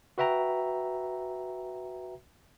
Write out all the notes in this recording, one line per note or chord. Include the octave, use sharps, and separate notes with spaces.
F#4 B4 E5 G5 A#5